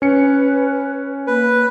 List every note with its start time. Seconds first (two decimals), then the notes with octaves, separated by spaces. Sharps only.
0.02 C#4 B4 C#7
1.27 A#3 B4